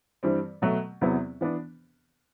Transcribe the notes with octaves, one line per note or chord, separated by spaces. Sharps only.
G2 E3 G3 C4
B2 F#3 A3
E2 C3 F#3 B3 E4
E3 B3 D4